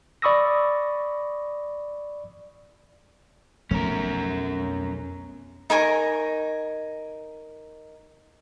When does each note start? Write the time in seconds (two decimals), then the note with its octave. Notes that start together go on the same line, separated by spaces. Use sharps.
0.22 D5 B5 C#6 D#6 E6 A#6
3.71 B1 F2 A3 C#4 A#4
5.70 D#4 A#4 G#5 C#6